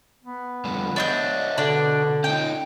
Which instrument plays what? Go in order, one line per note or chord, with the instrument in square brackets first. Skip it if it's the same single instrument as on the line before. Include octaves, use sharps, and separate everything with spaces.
[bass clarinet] B3
[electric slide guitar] F2 D3 G3
[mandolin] D4 G#4 G6 [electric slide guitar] C#5 D#5 E5
[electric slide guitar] B2 [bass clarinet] D3 [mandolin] D4 D5
[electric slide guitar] C#4 D#4 [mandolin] G5